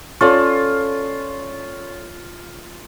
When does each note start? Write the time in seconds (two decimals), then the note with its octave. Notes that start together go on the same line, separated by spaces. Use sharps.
0.21 C#4 F4 A4 C#5 D5 C#6